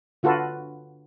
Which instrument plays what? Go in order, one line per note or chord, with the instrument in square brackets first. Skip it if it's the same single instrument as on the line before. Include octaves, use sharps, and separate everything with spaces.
[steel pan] D3 F4 F#4 A4 B4